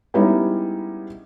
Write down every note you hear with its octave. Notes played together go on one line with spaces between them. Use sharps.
G3 G#3 B3 C#4 D#4 E4